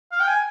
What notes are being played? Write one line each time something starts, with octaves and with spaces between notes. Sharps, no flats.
F5
G5
G#5